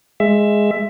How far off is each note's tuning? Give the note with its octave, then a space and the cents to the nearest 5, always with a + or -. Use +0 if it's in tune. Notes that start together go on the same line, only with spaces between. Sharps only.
G#3 +0 E5 +15